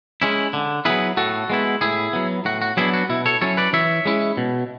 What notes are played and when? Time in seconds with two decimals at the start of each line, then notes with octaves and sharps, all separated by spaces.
0.22 G#3 C#4 E4
0.53 D3
0.85 F#3 B3 E4 G#4 B4
1.17 A2 F#4 A4
1.50 G#3 B3 E4
1.81 A2 E4 G#4
2.13 F#3 B3
2.45 A2 F#4
2.62 F#4
2.77 F#3 B3 D4 E4 G#4
2.94 F#4
3.09 B2 E4
3.26 A4 C#5
3.41 F#3 C#4 E4 A4 C#5
3.57 B4 D5
3.73 E3 C#5 E5
4.05 G#3 C#4 E4
4.37 B2